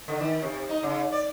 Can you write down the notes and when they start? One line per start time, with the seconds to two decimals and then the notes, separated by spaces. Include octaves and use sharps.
0.08 D3
0.20 D#3
0.42 C3
0.69 D#4
0.83 C#3
1.12 D5